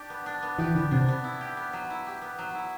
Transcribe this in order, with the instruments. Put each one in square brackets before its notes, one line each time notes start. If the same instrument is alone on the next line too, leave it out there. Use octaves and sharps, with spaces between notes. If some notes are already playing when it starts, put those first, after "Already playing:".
Already playing: [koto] D4 G4
B3
D4
B3
[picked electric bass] E3 [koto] G4
[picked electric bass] D3 [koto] B3
[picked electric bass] C3 [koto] D4
[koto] B3
E4
G4
B3
F#3
E4
G4
B3
F#3
E4